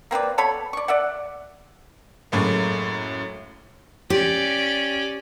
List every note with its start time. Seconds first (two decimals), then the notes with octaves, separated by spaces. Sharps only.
0.11 A#3 C4 B4 D5
0.38 B3 A4 C#5 B5
0.73 D5 C#6
0.88 D5 E5 F#5
2.32 F#2 A2 G#3 A#3
4.10 C#4 G4 D5